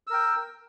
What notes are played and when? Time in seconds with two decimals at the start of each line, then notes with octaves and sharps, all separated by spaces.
0.07 E6
0.10 A#4
0.13 G5